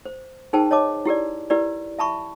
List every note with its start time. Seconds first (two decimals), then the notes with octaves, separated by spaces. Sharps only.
0.06 C5
0.53 D#4 G#4 A#4 C5 G5 A5
0.71 C#5 D#5 A5 D6
1.06 E4 G4 A#4 D5
1.50 E4 G4 A#4 B4 D5
1.99 E5 A5 B5 C#6